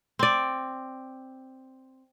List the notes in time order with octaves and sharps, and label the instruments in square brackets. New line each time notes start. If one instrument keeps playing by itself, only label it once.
[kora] C4 D5